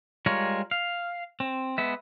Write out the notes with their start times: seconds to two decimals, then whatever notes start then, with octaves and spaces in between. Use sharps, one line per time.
0.26 G3 G#3 F4 A#4 C#5
0.71 F5
1.40 C4
1.78 G#3 B3 E5